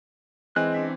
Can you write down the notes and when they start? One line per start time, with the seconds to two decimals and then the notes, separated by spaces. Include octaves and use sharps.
0.56 E3 G#3 C4 G#5 F#6
0.74 C#4 D4 E5